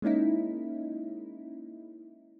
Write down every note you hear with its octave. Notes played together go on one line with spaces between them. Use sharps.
G#3 A#3 C#4 D#4 E4